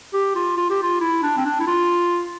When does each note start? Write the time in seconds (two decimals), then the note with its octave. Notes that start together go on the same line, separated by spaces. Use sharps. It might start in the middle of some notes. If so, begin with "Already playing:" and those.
0.14 G4
0.35 F4
0.57 F4
0.70 G4
0.82 F4
1.01 E4
1.23 D4
1.37 C4
1.45 D4
1.60 E4
1.67 F4